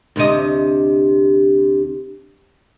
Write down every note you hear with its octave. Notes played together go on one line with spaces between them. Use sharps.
D2 C3 D#5